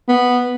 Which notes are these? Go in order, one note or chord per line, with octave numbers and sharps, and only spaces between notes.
B3